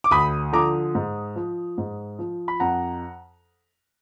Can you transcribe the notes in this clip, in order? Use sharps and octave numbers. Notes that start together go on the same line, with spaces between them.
D6
D2 B5 D#6
D3 F3 A#5 D6
G#2
F3
G#2
F3
B5
F2 F#5 A#5